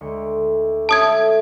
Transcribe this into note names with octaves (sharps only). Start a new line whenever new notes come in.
D2 G#3 C#7
A4 C#5 E5 A5 D#6 G#6